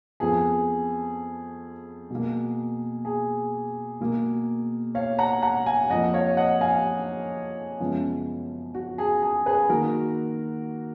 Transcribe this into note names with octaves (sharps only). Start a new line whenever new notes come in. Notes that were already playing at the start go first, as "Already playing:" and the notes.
F2 F3 B3 G#4
B2 A#3
G#4
B2 A#3
C#5 F5
F#5 A#5
F#5 A#5
F5 G#5
F2 F3 A#3 D#5 F#5
C#5 F5
D#5 F#5
F5 G#5
F#2 C#3 F3 G#3 B3
F#4
G#4
G#4
G#4 B4
D#3 A#3 F#4 A#4